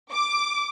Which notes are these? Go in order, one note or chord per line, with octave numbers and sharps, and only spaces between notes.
D6